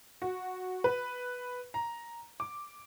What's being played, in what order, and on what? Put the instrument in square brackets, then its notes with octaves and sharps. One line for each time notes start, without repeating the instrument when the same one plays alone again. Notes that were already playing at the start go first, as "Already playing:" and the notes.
[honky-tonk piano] F#4
B4
A#5
D6